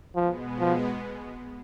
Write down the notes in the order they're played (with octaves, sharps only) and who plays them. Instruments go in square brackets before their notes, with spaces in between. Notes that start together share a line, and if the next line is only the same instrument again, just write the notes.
[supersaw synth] B2 G#3 B3 [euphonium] F3
[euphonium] F3